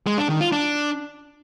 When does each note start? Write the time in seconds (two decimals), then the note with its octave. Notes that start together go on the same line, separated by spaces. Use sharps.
0.07 G#3
0.18 D4
0.29 D#3
0.41 F4
0.52 D4